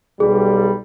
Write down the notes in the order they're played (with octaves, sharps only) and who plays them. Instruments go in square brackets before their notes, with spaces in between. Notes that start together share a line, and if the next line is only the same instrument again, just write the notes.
[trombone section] B1 G3 [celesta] G#4